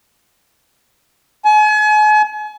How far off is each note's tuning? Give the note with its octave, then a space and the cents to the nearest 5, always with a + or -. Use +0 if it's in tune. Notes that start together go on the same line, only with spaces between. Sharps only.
G#5 +40